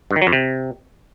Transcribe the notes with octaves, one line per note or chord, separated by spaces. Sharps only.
G2
D#3
F#3
F2
C3